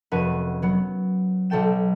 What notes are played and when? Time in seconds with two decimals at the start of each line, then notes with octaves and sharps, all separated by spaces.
0.12 F1 C#4 F#4 B4 D#7
0.62 F#3 B3
1.50 B1 F#3 A4 G5 E7